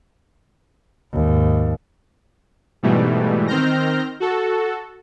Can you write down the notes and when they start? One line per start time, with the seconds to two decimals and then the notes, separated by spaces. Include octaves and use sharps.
1.13 D#2 G#2
2.83 G#2 B2 E3 G3 A3
3.47 D#3 C4 F6 G6 A#6
4.20 F#4 A4